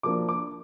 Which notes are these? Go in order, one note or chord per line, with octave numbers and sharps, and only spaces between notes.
F3 A#3 D4 D6
D6